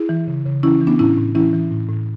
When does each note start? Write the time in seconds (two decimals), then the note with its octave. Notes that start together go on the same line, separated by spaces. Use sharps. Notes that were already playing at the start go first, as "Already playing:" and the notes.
Already playing: E4 G#4
0.09 E3
0.27 C#3
0.45 C#3
0.63 E3 C#4 E4
0.81 E3
0.87 B3 D4
0.99 A2 C#4 E4
1.17 A2
1.35 E3 C#4 E4
1.53 E3
1.72 A2
1.89 A2